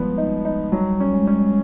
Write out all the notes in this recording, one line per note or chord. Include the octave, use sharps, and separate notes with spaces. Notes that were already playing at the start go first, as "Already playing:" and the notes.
Already playing: F3 G3 G#3 B3
D#4
D#4
F#3 G3
C#4
G#3
C#4